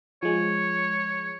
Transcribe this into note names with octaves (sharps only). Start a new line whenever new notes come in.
F3 G#3 C#5